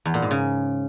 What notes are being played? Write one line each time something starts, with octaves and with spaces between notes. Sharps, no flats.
E2
A#2
G#2
C#3